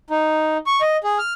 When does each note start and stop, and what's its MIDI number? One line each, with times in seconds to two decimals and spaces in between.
0.10 0.58 63
0.67 0.81 85
0.81 0.97 75
1.04 1.18 68
1.19 1.33 89